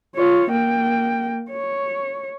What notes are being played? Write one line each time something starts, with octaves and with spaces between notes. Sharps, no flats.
F4 C#5
A#3 G5
C#5